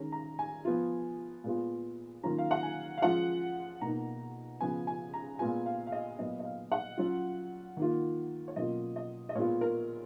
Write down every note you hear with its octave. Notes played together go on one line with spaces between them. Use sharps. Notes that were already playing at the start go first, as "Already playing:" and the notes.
Already playing: D#3 G#3 C#4 A#5
A#5
G#5
F3 B3 F4
A#2 G#3 B3 F4
D#3 F#3 A#3 C#4 F4 A#5
F5
F#5
G#5
F5
F3 G#3 C#4 F4 F#5
B2 A#3 D#4 A#5
C#3 F3 B3 G#5
G#5
A#5
A#2 G#3 B3 F4 G#5
F5
F5
D#5
A#2 F#3 B3 D#5
D#5
F5
F#5
F#3 C#4 F4
D#3 A#3 F4
C#5
B2 F#3 A#3 C#4 F4 D#5
D#5
D#5
A#2 G#3 B3 F4 C#5
A#4